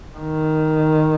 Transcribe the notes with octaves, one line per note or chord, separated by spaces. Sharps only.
D#3